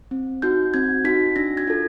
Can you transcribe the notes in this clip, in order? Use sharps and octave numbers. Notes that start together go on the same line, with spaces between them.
C4
D#4 F#4 G6
C4 G#6
D#4 F#4 B6
D4 A#6
G#6
F4 A4